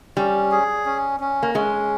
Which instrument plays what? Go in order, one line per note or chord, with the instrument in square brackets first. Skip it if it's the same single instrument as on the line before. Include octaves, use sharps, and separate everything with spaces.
[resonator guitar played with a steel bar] G3 [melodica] C#4
[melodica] G#4
C#4
C#4
[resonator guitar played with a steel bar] A#3
[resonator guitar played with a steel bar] G#3 [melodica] C#4